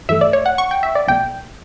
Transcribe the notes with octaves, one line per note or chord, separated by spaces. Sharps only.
G2 E3 A3 E5
D5
C#5
F#5
C#6
G5
E5
D5
B1 B2 A3 G5